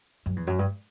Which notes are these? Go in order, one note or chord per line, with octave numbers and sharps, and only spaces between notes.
F#2
E2
F#2
G2